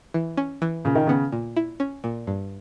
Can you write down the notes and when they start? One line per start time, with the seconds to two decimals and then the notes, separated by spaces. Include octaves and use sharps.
0.14 E3
0.37 C#4
0.62 E3
0.85 A#2 C#3
0.95 D#3
1.07 C#3 B3
1.32 A#2
1.56 E4
1.80 C#4
2.04 A#2
2.27 G2